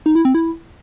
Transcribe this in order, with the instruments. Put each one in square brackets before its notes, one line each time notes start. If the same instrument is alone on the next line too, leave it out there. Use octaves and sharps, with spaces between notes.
[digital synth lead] D#4
E4
C4
E4